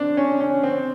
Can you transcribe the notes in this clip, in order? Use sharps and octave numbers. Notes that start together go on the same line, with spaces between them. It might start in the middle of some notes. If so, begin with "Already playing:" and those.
Already playing: C4 D4
C#4
C#4
C4